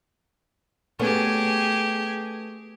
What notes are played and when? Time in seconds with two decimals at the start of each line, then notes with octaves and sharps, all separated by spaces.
0.99 A3 B3 C#4 G4 G#4